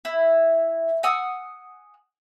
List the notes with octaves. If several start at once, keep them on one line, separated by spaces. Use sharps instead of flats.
E4
F#5 G#5 D#6 E6